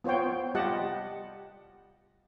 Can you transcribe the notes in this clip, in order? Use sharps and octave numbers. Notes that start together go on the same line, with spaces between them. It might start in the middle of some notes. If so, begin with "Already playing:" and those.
B3 F4 C5 C#5 G5
G3 F4 G4 D#5 F#5 A5